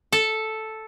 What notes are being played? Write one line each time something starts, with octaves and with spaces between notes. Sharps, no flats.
A4